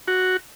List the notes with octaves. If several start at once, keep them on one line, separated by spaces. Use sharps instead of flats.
F#4